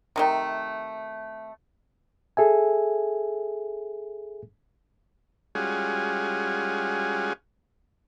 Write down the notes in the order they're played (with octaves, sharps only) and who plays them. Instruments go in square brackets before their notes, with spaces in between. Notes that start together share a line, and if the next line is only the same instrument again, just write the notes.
[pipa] C3 D#3 A3
[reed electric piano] G#4 A4 E5 G#5
[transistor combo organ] G3 G#3 C#4 F4 F#4 G#4